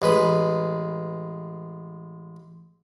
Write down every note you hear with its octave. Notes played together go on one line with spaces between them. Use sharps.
A1 G#3 B4 B5